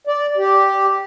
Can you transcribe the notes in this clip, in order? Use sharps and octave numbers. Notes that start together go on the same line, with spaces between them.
D5
G4